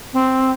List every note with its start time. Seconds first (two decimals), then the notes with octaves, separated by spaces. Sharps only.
0.13 C4